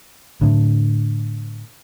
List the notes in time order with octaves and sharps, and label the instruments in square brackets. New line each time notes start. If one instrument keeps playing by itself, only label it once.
[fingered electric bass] A2 D3